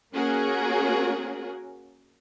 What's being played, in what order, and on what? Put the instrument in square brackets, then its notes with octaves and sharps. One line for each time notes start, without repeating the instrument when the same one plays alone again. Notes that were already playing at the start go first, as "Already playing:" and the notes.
[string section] A#3 C#4 F#4 G#4 A#4